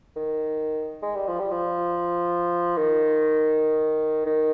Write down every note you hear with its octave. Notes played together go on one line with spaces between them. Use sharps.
D#3
G#3
G3
F3
G3
F3
D#3
D#3